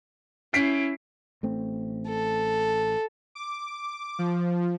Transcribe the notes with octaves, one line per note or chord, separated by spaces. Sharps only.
C#4 E4 B6 C7 D7
A1 A3 C4
A4
D6
F3